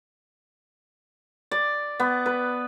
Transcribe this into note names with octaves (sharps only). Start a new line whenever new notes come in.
D5
B3
B4